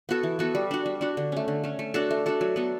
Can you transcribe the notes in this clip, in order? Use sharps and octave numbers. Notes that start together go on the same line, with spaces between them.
B3 F#4 A4
E3
B3 F#4 A4
G3
D4 F#4
G3
D4 F#4
D3
A3 C#4
D3
A3 C#4
A3
D4 F#4 A4
A3
D4 F#4 A4
F#3
B3 F#4 A4